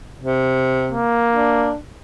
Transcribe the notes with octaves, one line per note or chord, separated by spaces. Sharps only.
C3
A#3
D4